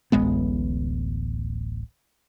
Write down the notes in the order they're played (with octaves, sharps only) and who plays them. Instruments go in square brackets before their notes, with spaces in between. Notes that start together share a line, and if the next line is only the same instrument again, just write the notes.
[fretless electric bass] D1 A1 G#3 B3